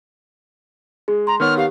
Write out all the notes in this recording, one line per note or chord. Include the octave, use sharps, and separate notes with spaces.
G#3 G#4
A#5 C6
D#3 B3 C#5 F6
G4 F5